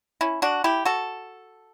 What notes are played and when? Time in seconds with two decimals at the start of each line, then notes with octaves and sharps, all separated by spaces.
0.21 C#4 E4
0.42 D4 F#4
0.64 E4 G4
0.85 F#4 A4